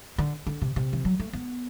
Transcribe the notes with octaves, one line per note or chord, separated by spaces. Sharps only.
D3
D3
C3
C3
E3
F#3
A3
B3